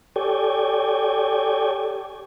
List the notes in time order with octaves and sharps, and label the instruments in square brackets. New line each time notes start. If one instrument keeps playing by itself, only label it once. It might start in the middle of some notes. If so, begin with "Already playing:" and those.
[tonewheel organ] G4 A4 C#5 D5 G5 G#5